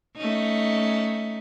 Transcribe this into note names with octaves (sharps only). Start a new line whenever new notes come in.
A3 C#4 D#4